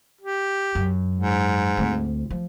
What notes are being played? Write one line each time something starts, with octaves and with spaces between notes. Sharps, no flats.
G4
F#2
G#2
D2 C4
F3